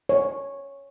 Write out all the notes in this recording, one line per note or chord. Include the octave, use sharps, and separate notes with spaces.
C#5